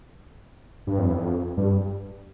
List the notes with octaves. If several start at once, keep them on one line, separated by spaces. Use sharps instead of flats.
G2
F2
E2
F2
G2